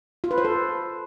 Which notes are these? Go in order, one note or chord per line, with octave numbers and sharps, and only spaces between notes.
F4
B4
C5
A4